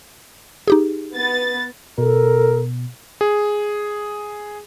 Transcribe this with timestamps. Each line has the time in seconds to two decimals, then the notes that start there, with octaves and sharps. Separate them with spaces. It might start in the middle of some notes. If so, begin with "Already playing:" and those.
0.68 D#4 G4 G#4
1.14 B3 A6
1.98 B2 A4 A#4
3.21 G#4